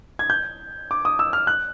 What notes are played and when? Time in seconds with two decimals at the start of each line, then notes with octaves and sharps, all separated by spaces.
0.19 G#6
0.30 G6
0.91 D6
1.05 D#6
1.19 E6
1.33 F6
1.47 F#6